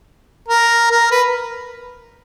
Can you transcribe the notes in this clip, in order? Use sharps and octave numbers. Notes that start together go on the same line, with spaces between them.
A#4
A#4
B4